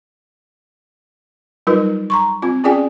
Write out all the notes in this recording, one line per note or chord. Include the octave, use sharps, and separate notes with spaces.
F#3 G3 D#4 F4 A#4 B4
A#5 C6 C#6
C4 F4
C#4 F4 G#4 D5 G5 G#5